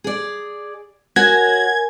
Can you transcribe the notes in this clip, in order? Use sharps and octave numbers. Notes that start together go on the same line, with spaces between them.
G#4 D5
F#4 A#4 C#5 F#5 G#5 G#6